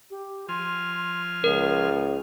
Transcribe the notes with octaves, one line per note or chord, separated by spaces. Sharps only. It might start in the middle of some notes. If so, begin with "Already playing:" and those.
G4
F3 G#5 C6 F6
C#2 G#4 A#4